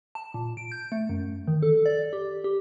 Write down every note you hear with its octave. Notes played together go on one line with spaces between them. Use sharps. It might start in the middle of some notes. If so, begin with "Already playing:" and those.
A5
A#2
D7
G6
A3
F#2
D#3
A4
D5
G4
G4